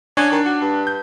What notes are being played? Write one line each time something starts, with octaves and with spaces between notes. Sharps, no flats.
C#4 D4
D#3
F#4
G2
G6